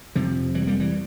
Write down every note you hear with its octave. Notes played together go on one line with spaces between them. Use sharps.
F2 C3 F3
E3 G3
G3 A#3
E3 G3